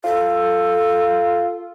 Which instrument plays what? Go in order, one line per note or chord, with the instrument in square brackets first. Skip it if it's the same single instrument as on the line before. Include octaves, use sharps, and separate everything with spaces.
[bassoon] F4 [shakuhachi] A4